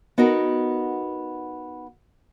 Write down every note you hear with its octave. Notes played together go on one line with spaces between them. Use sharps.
B3 D#4 F#4 A#4